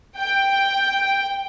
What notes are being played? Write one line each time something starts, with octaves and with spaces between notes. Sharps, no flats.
G5